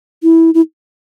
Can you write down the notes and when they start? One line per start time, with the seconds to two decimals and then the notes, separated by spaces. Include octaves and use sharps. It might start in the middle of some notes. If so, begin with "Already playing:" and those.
0.23 E4
0.54 E4